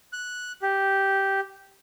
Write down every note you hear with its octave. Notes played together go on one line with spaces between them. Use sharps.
F#6
G4